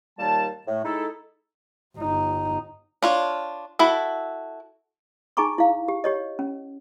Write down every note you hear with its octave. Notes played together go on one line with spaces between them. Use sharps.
D#2 A#2 G3 A5
A2 A3
G#3 D#4 E4 A4
G1 D#4
D4 F4 C#5
E4 F#4 A4
D#4 G#4 G#5 A#5 C#6 D6
E4 F5
G4
G4 C#5 D#5
C#4